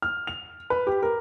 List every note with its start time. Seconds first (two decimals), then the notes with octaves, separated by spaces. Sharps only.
0.02 F6
0.27 F7
0.70 B4
0.87 G4
1.03 A#4